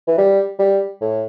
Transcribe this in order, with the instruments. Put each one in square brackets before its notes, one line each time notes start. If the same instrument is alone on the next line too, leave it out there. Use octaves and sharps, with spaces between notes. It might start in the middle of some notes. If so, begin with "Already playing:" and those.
[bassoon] E3
G3
G3
A2